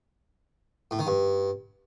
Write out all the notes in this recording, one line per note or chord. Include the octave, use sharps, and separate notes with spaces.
A2
D#3
G2